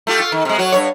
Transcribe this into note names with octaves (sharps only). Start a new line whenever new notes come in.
A3 F4 G4
F4
D#3
C3 G#3
F#3 F#4 C#5
G2 A#2 C#5